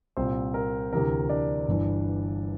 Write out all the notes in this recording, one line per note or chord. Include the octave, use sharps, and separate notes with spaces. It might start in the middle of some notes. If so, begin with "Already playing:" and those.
C2 A#2 C4 C5
A#4
D2 C3 E3 A#4
D4 D5
G1 G2 E3